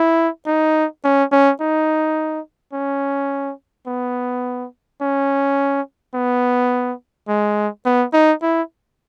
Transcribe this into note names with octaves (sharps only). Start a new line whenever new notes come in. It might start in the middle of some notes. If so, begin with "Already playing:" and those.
Already playing: E4
D#4
C#4
C#4
D#4
C#4
B3
C#4
B3
G#3
B3
D#4
E4